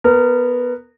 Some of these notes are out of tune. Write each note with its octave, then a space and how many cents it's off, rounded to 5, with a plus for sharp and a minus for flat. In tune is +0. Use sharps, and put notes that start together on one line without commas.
B3 +0 A#4 -20